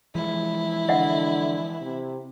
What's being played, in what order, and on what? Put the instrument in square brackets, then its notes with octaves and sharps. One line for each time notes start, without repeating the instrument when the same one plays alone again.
[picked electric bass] E3 F3 G#3 [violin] E4
[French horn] D3 [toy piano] D#5 E5 F#5
[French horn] C3